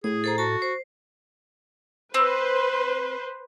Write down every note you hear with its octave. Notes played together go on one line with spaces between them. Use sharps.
A2 G#4 D#6
A4 C5 A#5
F#4 A4 A5
C5
C4 B4 C5